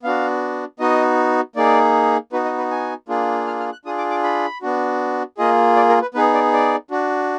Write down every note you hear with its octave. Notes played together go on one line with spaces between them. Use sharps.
B3 D4 F#4 F5
B3 D#4 F#4 D#5
A#3 D#4 G#4 D5
B3 D#4 F#4 B4
D#5
B4
G#5
A#3 D4 F4 G#4
F6
F6
F#6
D4 F4 G#4 D#6
D6
D6
B5
B3 D4 F#4
A#3 F4 G#4 D#5
D5
A#4
B4
B3 D#4 G#4 B4
D5
D5
D4 F#4